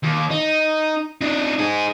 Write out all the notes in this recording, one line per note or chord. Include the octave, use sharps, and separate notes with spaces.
D#2
D#4
D4 D#4
D#4 G#4